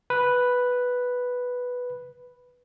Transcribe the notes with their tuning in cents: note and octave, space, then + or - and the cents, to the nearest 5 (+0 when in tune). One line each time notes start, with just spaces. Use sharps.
B4 +0